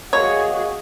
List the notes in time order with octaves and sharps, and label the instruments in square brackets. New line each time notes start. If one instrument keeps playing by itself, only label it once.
[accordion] A#3 D#5 [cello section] F#4 G#4 [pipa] C#5